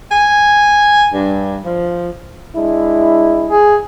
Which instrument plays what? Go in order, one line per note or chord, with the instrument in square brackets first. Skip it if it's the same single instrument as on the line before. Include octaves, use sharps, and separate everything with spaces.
[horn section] G#5
G2
F3
[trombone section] G#3 D4 E4
[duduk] G#4